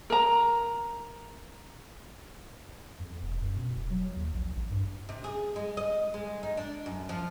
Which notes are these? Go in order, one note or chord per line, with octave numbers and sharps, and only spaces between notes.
A#4 A#5
F2
E1
F#2
B2
E1
F#3
D#2
A#1
A1
G2
C3
G#4
G#3
D#5
G#3
D#4
D4
F#2
F3